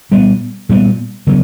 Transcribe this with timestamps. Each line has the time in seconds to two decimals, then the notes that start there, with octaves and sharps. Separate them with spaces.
0.11 A#2 G3 B3
0.69 A#2 G3 B3
1.27 C#3 F#3 B3